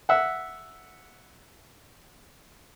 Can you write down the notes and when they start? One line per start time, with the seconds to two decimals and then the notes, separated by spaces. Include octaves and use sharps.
0.09 E5 F#5